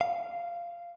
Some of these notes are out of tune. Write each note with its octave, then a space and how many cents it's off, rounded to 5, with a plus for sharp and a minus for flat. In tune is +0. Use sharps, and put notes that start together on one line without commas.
F5 -15